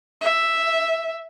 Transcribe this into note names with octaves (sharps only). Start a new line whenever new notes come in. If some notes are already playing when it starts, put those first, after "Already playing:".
E5